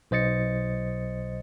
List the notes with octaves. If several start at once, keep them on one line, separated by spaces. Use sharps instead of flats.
B1 C5 D#5 A6 C#7